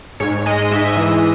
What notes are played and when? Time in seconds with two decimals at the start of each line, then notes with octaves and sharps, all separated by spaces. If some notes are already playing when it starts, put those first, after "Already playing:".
0.20 G#2 C#5
0.46 G#3 D#5
0.62 D#5
0.71 G#2 E5
0.96 E3